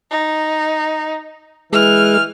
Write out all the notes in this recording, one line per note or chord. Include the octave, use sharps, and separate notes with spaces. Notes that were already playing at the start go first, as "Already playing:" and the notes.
D#4
E3 G#3 F6